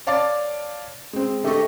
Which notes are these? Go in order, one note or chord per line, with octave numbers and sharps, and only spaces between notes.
C#5 D5 F5 A5 D6 A6
G#3 C4
D3 A3 G4 A4 D#5 C#6